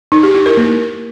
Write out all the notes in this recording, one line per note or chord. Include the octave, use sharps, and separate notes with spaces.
D#4
G4
E4
A#4
A#3